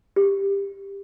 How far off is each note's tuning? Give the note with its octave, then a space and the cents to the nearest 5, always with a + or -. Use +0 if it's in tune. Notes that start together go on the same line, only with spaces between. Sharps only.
G4 +15